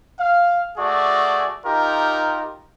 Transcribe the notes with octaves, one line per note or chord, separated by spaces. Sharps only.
F5
A3 F#4 G#4 D5
D#4 F4 G4 A#4